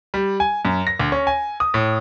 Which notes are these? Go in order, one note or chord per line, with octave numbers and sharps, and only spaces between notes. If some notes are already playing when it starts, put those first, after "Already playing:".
G3
G#5
F#2
A#6
D2
C#4
G#5
D#6
A2